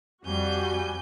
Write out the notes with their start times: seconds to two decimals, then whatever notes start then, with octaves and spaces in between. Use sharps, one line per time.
0.24 F2 G3 F#4 G#5 G6